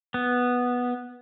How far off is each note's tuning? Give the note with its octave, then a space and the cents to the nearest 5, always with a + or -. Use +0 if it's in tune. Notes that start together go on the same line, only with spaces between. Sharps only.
B3 -5